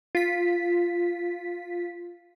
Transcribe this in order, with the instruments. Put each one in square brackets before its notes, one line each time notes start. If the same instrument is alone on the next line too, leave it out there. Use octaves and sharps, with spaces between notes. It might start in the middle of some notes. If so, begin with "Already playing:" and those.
[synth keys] F4 B6